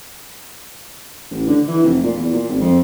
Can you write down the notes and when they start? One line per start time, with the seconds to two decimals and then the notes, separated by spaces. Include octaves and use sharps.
1.31 A1
1.47 D3
1.68 E3
1.84 F1
2.03 A#2
2.17 E2
2.32 A#2
2.49 G#1
2.61 F2